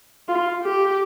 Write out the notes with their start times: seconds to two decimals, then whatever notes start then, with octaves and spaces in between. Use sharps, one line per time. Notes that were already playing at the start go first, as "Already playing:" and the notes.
0.28 F4
0.63 G4